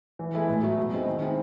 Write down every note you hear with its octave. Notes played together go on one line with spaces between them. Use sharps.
E3
G#3 B3 E4 A4
A2
F#3 A3
B2
G#3 C4 D#4
D#3
G#3 C4 E4 G#4